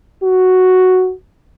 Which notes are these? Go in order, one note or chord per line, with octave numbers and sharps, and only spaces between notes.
F#4